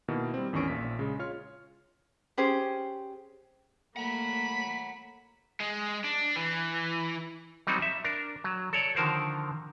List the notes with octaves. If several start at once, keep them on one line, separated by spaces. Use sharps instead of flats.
B2 D#3 A#3 E4
G3 C4
A1 E2 D#3 C#4 C#6 D7
A#1 A#2 B6
C#3 G#3
F4 C#5 F6
C#4 G4 G#4 C5
A3 A#3 F#5 A#5 B5
G#3
D4
E3
F#3 G3 C4 D#4 F#4
E5
D4 A#4
F#3
A4 C#5 D5
D3 D#3 F3 A#4 C5